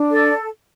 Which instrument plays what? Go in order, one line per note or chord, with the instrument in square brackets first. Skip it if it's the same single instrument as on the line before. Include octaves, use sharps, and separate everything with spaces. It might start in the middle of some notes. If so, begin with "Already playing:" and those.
Already playing: [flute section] D4
A4 D5